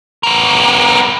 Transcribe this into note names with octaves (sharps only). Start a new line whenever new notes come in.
B3 A#4